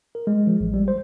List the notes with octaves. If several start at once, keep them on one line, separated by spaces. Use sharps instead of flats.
A#4
G#3
F3
A1
G3
C5